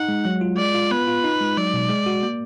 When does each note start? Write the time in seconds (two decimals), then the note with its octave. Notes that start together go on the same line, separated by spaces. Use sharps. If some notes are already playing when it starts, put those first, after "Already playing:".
Already playing: D#4 F#5
0.09 G#3
0.25 F#3
0.41 F4
0.57 G#3 D5
0.74 F4
0.91 B3 B4
1.07 F4
1.24 D#4
1.40 G#3
1.57 F#3 D5
1.74 B2
1.90 G#3
2.06 F#4
2.23 A#3